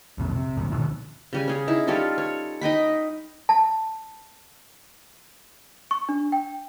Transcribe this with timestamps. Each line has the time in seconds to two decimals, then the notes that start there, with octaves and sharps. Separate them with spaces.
0.18 B1 F2 A#2
0.34 C3
0.57 G#1 D2 A#2
0.71 B2 D3 D#3 F3
1.33 C#3 G3 G#5
1.48 C#4 G#4
1.68 D#4 E4
1.87 G3 F4 A4 C#5
2.18 C#5
2.61 D#4 D#5 G5 B5
3.49 A5
5.91 C#6
6.09 D4
6.32 G5